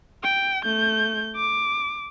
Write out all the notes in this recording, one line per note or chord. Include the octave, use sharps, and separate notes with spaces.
G5
A3 G6
D6